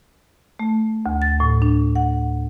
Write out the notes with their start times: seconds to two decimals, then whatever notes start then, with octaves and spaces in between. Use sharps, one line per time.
0.59 A3
1.06 D2
1.22 A6
1.40 A2
1.62 D4
1.95 F#5